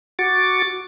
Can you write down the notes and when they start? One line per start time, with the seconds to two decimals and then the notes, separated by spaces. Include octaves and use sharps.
0.19 F#4 C#6 D6 A6